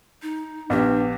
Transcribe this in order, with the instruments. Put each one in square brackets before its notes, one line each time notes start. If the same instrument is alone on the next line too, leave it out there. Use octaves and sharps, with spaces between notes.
[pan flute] D#4
[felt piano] A#1 G4 [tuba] B3 [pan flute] D4